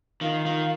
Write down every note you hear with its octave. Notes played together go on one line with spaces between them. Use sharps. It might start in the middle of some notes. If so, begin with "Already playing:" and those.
D#3 F4 F5
D#3